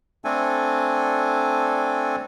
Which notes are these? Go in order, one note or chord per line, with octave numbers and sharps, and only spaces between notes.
A3 C4 D4 A4 G#5